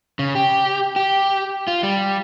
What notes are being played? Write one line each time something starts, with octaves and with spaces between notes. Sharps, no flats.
C#3
G4
G4
F4
G3